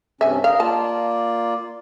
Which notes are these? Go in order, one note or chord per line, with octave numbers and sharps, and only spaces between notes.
G2 C3 C#4 E5 G#5
A#4 D#5 F5
A#3 F4 D5 A5